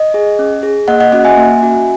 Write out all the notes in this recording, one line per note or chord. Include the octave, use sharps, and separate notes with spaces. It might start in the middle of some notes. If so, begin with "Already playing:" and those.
Already playing: D#5
G#4
C#4
G#4
A#3 D#5 F#5
D#5 F#5
C#4 F#4 D#5 F#5
E5 G#5
A#3
C#4 F#4